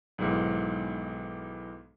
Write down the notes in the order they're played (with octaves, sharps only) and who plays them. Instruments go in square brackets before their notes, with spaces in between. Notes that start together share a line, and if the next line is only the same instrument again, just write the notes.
[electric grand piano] B1 G#2 D#3 E3 G#3